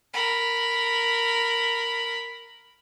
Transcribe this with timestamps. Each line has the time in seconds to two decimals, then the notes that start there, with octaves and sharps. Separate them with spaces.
0.14 A#4 B5